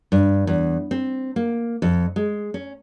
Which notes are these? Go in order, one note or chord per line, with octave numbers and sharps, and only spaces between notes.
G2
E2
C4
A#3
F2
G#3
C#4